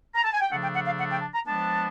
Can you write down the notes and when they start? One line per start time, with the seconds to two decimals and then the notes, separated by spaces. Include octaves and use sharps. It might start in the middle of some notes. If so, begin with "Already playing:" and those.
0.15 A#5
0.24 A5
0.32 G#5
0.41 G5
0.50 C#3 F3 A3 D4 F#5
0.63 G5
0.74 F#5
0.86 F5
0.98 F#5
1.10 G5
1.21 A5
1.34 A#5
1.46 F3 G#3 B3 D4 A5